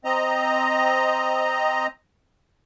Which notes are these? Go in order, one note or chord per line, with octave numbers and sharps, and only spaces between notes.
C4 D#5 A#5